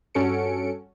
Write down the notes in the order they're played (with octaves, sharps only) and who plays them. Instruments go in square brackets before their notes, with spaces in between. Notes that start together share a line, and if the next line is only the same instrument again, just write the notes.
[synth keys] G2 C#4 F#4 A4 C#7 D7